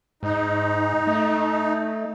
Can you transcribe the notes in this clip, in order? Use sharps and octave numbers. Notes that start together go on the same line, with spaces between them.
G#2 D#4
A3